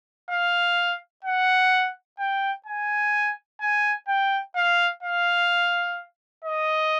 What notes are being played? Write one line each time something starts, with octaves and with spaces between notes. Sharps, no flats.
F5
F#5
G5
G#5
G#5
G5
F5
F5
D#5